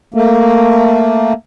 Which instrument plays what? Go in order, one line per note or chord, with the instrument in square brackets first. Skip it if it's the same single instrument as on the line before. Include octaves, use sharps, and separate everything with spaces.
[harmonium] A3 A#3